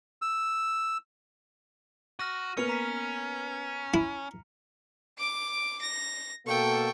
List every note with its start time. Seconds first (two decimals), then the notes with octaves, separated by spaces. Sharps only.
0.22 E6
2.19 F#4 F6 A#6 D#7
2.57 A#3 B3 C#4 B4 C#7 F7
2.69 A#5 B6
3.94 E4
5.18 D6 D7
5.82 A#6
6.47 B2 A#3 A4 G5 C#6